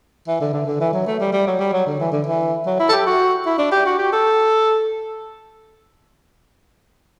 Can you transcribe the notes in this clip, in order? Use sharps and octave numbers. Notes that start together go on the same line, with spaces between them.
E3
D3
D3
D3
E3
F#3
A3
G3
G3
F#3
G3
F#3
D3
E3
D3
E3
F#3
E4
A4
G4
F#4
E4
D4
G4
F#4
G4
A4